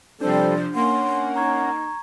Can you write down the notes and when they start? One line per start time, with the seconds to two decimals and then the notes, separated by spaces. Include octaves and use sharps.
0.21 C3 F3 G3 C4 D4 A4 C5 D5
0.75 A#3 C#4 F#5 C6
1.36 D#4 A#5 C#6 G#6